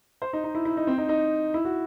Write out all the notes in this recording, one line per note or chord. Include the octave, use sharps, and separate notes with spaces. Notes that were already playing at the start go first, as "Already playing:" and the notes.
C5
D#4
D#4
E4
E4
D#4
C4
D#4
D#4
E4
F#4